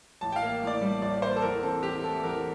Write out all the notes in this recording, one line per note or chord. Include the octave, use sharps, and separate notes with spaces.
A1 A5
G5
F5
A#3
A2
D5
G3
A1 D5
A#3 C5
A4
E2 A#4
C4 A4
E3 G4
A3 A4
E2 A#4